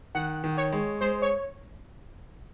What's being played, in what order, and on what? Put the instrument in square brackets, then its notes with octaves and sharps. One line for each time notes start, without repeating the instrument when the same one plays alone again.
[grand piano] D#3 [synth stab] F#5
[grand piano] D#3
[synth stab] C#5
[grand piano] G#3
[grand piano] G#3 [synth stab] C5
[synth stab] C#5